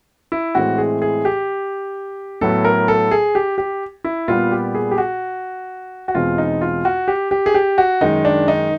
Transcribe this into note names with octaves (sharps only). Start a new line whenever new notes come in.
E4
A2 E3 G#3 C4 F#4
G#4
G#4
G4
A2 F#3 B3 A4
A#4
A4
G#4
G4
G4
E4
A#2 G3 B3 F4
G4
G#4
G4
F#4
F#4
E2 B2 G#3 C4 F4
D#4
F4
F#4
G4
G4
G#4
G4
F#4
F#2 D#3 G#3 D#4
D4
D#4